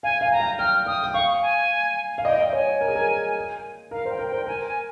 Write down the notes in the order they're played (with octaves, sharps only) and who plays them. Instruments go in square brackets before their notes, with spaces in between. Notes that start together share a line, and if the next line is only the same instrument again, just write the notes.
[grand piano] F5 [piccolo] G#5
[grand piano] F5
[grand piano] G5 [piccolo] A#5
[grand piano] F5
[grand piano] G5 [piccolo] F6
[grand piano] G5 [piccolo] D#6
[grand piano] G5
[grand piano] F5 [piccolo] C#6
[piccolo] G#5
[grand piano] F5
[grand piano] D#5 [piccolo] G5
[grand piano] D#5
[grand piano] C#5 [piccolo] G#5
[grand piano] A#4
G#4
A#4
[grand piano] A#4 [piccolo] F5
[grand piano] C5 [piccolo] G5
[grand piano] A#4
[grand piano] C5 [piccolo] G5
[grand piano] A#4 [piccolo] G#5
[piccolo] G#5